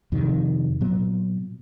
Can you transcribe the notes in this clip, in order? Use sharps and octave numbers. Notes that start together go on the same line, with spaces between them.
F2 C3 D#3
A#2 F#3 B3